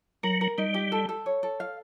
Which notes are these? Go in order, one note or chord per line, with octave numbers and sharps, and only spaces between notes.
F#3 A#4
A#4
G3 D#4
G4
A4
A4
C#5
A4
F5